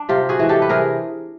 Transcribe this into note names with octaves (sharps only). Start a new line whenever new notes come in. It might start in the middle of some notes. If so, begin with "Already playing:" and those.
Already playing: D4
C3 F4 G4
F#4 G#4
E3 G#3
G4 A4
B4
C3 G#4 A#4